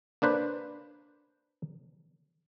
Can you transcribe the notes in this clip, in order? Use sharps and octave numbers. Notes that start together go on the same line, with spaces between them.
A#3 D4 B4 C5